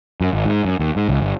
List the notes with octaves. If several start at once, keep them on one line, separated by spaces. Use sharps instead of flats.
F#2
G#1
G#2
F#2
D#2
G#2
C#2
G1